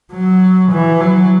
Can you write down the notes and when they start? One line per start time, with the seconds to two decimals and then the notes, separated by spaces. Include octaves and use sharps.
0.13 F#3
0.72 E3
1.01 F#3